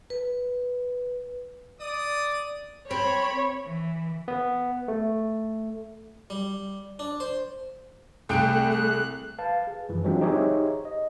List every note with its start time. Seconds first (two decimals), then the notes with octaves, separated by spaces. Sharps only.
0.10 B4
1.81 D5 D#6
2.91 C4 C#5 B5
3.65 E3
4.28 B3
4.88 A3
6.30 G3
6.99 D4
7.20 C5
8.29 C2 A3 G#4 G5 F#6 D7
8.71 F#6
9.38 B4 F5 A5
9.67 G#4
9.89 F#2 E3 F3
10.04 E3 F#3 G#3 C4 D4 F4
10.21 D#4 G4 G#4 C5 C#5 E5
10.85 D#5